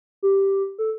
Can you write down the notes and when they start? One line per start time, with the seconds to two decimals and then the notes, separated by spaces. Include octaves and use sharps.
0.23 G4
0.79 A4